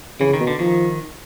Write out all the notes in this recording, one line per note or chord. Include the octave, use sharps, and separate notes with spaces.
C#3 E3
D#3
B2
D3
D#3 F3